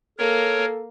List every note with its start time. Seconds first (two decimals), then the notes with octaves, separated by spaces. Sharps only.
0.18 A#3 A4 A#4 C#5